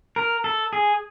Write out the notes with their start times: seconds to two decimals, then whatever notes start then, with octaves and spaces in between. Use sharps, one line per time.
0.16 A#4
0.44 A4
0.73 G#4